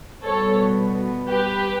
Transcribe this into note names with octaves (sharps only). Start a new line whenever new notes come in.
B2 G3 B3 A4 C#5
G4 B4